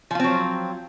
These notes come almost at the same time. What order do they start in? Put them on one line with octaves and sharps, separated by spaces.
F3 F4 C4 F#3